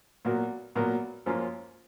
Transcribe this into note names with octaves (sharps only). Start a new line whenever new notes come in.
A#2 F#3 B3 F#4 A#4
A#2 F#3 B3 F#4 A#4
F#2 F3 A#3 C#4 F4